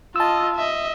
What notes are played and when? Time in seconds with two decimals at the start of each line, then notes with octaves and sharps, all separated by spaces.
0.16 F4 D#5 A5 E6
0.56 D#5 E5